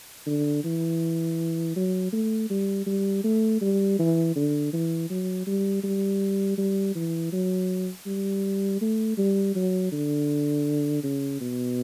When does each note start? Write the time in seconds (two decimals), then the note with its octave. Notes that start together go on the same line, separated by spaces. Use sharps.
0.27 D3
0.65 E3
1.76 F#3
2.13 A3
2.50 G3
2.86 G3
3.24 A3
3.61 G3
3.99 E3
4.36 D3
4.73 E3
5.10 F#3
5.47 G3
5.84 G3
6.58 G3
6.95 E3
7.33 F#3
8.06 G3
8.81 A3
9.18 G3
9.55 F#3
9.92 D3
11.04 C#3
11.41 B2